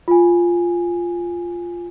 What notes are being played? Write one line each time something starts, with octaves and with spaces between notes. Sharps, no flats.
F4 G#5